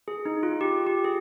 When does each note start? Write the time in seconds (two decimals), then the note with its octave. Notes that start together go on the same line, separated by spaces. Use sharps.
0.08 G#4
0.25 D#4
0.43 F4
0.61 G4
0.87 G4
1.04 G#4